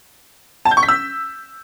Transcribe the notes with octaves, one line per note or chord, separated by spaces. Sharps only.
A5
G6
C#6
B6
E6